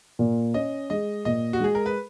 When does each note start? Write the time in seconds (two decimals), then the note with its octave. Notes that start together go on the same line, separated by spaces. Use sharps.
0.19 A#2
0.54 C#4 D#5
0.90 G#3 D#5
1.25 A#2 D#5
1.53 F#4
1.60 G#3 G#4
1.75 A#4
1.86 B4